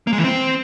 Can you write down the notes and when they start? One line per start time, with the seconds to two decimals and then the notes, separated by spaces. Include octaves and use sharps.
0.07 A#3
0.13 G#3
0.18 E3
0.24 C4